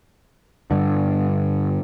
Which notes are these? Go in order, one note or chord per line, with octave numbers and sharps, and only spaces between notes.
G2 D3